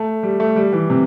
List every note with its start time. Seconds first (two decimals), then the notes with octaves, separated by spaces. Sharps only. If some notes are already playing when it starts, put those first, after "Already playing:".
Already playing: A3
0.23 G3
0.40 A3
0.56 G3
0.73 E3
0.90 C3